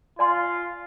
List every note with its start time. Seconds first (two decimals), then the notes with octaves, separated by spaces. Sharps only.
0.19 F4 D5 G#5 C6